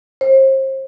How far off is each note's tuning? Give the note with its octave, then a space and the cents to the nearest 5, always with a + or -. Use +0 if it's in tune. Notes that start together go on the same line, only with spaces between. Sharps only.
C5 +35